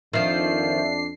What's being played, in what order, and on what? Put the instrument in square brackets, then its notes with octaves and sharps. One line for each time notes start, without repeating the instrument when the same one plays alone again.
[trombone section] F2 D4 [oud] D#3 F3 [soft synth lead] E5 [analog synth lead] C7